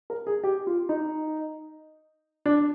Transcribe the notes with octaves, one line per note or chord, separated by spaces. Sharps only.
A#4
G#4
G4
F4
D#4
D4